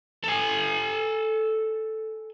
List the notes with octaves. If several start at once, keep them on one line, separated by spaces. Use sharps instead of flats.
A4 G#5